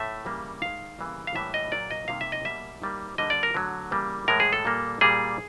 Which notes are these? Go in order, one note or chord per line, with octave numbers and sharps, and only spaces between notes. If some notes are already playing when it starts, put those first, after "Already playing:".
Already playing: A2 A3 E5
C#3 E3 G3 A#3
D#3 G#3 F5
C#3 E3 G3 A#3
F5
A2 E3 G3 A#3 E5
D#5
A#2 F#3 A#3 D5
D#5
C3 D#3 G3 A#3 F5
E5
D#5
B2 G3 A#3 E5
D#3 G3 A#3
D3 G3 A#3 D#5
D5
A#4
D3 F#3 A3
C#3 E3 G3 A#3
A2 E3 G#3 A#4
G#4
A4
A#2 G3 A#3
A#2 G3 A#3 G#4